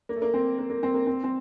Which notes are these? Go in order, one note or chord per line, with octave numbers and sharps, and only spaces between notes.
A#3
A3
A#3
C4
A#3
A#3
C4
A#3
C4
C4